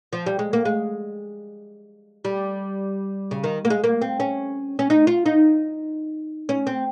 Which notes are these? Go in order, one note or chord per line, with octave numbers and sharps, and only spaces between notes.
F3
G3
G#3
A#3
G#3
G3
C#3
D#3
A#3
G#3
A#3
C4
C#4
C#4
D#4
F4
D#4
C#4
C4